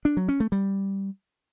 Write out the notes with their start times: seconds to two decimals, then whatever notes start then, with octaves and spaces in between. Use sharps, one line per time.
0.05 D4
0.17 F#3
0.29 C#4
0.40 A3
0.52 G3